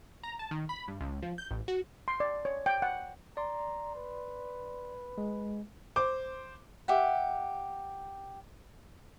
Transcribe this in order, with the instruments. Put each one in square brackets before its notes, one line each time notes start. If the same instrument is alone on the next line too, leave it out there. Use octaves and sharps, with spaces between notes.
[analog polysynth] A#5
A5
D#3
B5
G2
C#2
F3
G6
A1
F#4
[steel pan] C6
D5
C#5
G5
F#5
[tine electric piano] D5 C6 [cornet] A#5
[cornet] B4
[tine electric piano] G#3
[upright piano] C5 D6
[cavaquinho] G4 E5 F#5